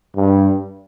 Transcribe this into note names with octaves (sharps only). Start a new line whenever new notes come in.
G2